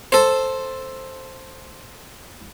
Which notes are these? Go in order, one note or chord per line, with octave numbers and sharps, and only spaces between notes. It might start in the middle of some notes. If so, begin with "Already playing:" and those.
A4 C5